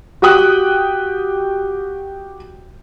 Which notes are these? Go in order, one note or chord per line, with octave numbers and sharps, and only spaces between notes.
F#4 G4 G5 D#6 F#6